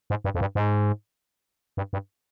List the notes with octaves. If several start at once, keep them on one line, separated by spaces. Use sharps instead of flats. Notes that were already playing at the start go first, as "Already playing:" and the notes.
G#2
G2
F2
G2
G#2
G2
G2